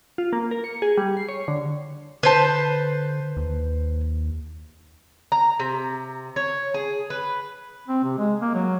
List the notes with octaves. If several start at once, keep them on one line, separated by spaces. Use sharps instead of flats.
F4
A#3
A#4
C#7
G#4
G3
C7
C#5
D3
D3 B4 C5 A5
D#2
A#5
C3
C#5
G#4
B4
C4
C3
G#3
A#3
F#3